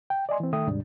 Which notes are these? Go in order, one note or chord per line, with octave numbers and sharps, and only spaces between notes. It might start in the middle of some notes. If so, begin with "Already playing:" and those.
G5
D5 D#5 G#5 C6
E3 C4
D#3 A3 A4 E5 G5 D#6
D#2 G#2 C3 G3 D4